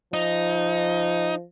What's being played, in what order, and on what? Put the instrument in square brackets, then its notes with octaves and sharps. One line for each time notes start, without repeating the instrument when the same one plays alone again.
[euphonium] F3 [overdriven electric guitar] D#4